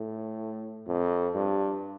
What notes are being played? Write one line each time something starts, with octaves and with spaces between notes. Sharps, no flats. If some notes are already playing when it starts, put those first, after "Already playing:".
Already playing: A2
F2
G2